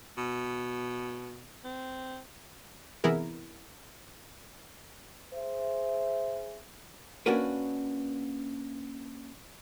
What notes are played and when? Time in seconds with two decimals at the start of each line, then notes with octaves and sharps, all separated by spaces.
0.17 B2
1.64 C4
3.04 C3 E3 B3 E4 G#4 A#4
5.33 G#4 C5 E5
7.26 A#3 C#4 D4 F#4 A#4 B4